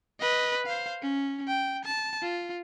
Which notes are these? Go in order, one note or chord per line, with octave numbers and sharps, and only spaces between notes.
B4 D#5
C5 F5
C#4
G5
A5
F4